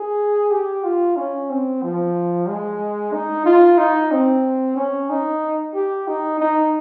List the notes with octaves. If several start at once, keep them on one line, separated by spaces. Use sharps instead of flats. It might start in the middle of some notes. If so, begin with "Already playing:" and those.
Already playing: G#4
G4
F4
C#4
C4
F3
G#3
D#4
F4
D#4
C4
C#4
D#4
G4
D#4
D#4